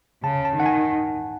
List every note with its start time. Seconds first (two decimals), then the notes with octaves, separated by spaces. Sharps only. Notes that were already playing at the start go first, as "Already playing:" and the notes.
0.24 C#3 A5
0.45 A5
0.56 D#3 F#5
0.66 G#5